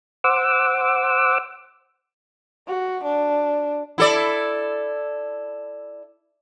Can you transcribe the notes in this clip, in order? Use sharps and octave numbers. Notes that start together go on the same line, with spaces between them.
C5 F#5 D6 E6
F#4
D4
E4 A4 D5